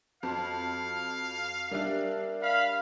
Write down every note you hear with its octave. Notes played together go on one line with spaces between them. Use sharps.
F2 F#4 F5 C6
G3 D4 A#4 D5 E5
F5 B5